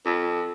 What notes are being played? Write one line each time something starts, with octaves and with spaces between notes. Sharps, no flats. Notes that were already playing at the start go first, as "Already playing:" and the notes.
F2